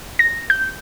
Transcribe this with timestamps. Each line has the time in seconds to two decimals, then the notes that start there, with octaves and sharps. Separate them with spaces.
0.19 A#6
0.50 G6